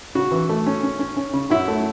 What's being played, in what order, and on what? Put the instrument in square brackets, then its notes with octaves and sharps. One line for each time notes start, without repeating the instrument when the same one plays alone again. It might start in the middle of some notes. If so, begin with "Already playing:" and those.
[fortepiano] C#3 F#4
E3
A3
C#4
C#4
C#4
C#4
C#3
F#2 E4
A3